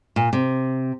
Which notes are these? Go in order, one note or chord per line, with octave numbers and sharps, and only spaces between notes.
A#2
C3